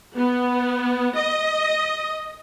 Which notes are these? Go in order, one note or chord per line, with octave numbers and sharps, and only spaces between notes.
B3
D#5